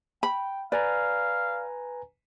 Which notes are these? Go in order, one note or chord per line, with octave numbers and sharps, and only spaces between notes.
G5 B5
B4 D5 F5 G#5 A#5